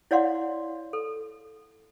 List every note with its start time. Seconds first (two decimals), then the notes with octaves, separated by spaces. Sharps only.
0.11 E4 C#5 D5 F5 F#5 C6
0.93 A4